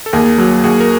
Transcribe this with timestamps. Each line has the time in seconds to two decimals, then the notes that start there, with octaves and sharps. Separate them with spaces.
0.06 A4
0.13 D#2 G#4 A#4
0.38 F#3
0.64 D#2 F#4 G#4
0.80 A#4